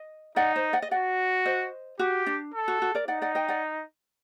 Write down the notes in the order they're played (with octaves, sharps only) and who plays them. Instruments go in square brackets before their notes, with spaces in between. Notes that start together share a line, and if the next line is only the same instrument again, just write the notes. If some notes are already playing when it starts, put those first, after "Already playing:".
Already playing: [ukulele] D#5
[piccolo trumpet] D#4 [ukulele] D5 F#5
[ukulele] C5 D#5
D5 F#5
D#5
[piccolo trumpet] F#4 [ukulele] D5 F#5
[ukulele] C5 D#5
[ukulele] F#4 [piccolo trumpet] G4
[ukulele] D4
[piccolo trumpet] A4
[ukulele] F#4
F#4
A#4 D5
[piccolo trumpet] D#4 [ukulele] D5 F#5
[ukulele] D5 F#5
D#5 G5
D5 F#5